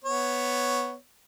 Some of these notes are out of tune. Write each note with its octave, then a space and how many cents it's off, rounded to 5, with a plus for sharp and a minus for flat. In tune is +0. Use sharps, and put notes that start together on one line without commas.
B3 +0 C#5 +0